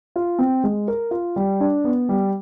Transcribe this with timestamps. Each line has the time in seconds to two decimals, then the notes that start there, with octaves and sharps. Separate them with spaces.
0.16 F4
0.39 C4
0.64 G#3
0.88 A#4
1.11 F4
1.36 G3
1.60 D4
1.84 B3
2.09 G3